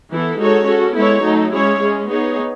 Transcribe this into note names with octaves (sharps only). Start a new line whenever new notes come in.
E3 B3 E4 A4
G#3 D#4 F#4 A4 C#5
C#4 F#4 A4
G#3 B3 E4 A4 C#5
F#3 A3 D#4 A4
G#3 C#4 E4 G#4 C#5
G#3 C#4 G#4
B3 D#4 G#4 C#5